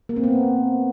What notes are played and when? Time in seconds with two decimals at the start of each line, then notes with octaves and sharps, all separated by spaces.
0.09 A#3
0.16 C4
0.24 B3